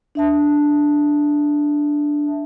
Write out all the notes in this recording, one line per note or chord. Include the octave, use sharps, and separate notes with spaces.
D4 E5 A5